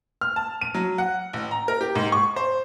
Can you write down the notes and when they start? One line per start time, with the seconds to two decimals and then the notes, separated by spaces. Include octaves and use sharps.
0.21 F6
0.36 A5
0.61 D#7
0.74 F#3
0.98 F#5
1.33 A1
1.51 A#5
1.68 A#4
1.81 G4
1.95 G#2
2.12 C#6
2.36 C5